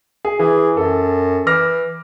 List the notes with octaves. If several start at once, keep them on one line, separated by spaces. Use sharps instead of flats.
G#4
E3 G#4
F#2 A4
E3 D6 F6 A#6